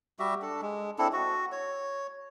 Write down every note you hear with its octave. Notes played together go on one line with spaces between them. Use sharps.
G3 F#4 G4 E5
D4 A4
G#3
C4 D4 E4 A4
F#4
C#5